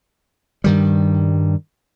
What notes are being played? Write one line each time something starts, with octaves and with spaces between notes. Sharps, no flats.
G2 D#3 G3